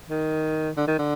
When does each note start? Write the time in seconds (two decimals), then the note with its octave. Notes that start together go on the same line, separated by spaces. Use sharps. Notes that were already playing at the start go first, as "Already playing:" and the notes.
0.10 D#3
0.77 D3
0.88 D#3
0.99 D3